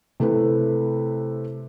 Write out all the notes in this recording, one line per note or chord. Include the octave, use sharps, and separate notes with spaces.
C3 A3 E4 B4